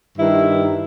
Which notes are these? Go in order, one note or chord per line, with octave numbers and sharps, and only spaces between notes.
G2 D#3 E4